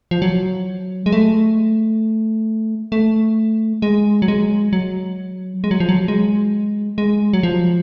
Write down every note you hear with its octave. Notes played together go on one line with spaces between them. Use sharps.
F3
F#3
G#3
A3
A3
G#3
F#3
G#3
F#3
G#3
F#3
F3
F#3
G#3
G#3
F#3
F3